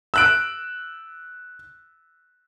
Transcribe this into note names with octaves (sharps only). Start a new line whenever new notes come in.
E6 F#6 D7